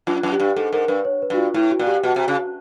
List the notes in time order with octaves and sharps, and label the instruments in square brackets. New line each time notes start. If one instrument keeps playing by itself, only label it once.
[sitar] F#2 [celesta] F4
[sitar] F#2
[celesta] G4
[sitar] G2
[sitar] G#2 [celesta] A4
[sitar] G#2 [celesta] A#4
[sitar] G2 [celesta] B4
[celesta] C#5
B4
[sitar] G2 [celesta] F#4
[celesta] F4
[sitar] A2 [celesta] E4
[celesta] F#4
[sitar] A#2
[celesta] G4
[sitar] B2 [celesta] F#4
[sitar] C3
C#3